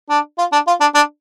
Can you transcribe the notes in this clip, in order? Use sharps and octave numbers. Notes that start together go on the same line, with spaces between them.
D4
F4
D4
F4
D4
D4